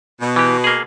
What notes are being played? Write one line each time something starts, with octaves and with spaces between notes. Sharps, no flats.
B2
E3 G4
A#3 G#4